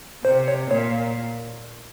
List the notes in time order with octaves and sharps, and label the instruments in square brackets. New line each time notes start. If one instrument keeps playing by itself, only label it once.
[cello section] C3 [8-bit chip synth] C5
[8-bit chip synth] C#5
[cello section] A#2 [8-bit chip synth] C#5